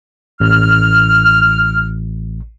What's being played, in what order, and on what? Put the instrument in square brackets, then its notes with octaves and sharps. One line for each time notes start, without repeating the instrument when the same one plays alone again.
[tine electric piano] A1 [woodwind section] F6